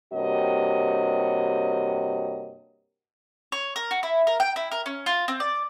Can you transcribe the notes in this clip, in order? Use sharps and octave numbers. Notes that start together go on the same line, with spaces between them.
G2 C3 A#3 F#4 C#5 D#5
C#5
A#4
F#4
E4
A#4
G5
E4
A#4
C#4
F4
C4
D5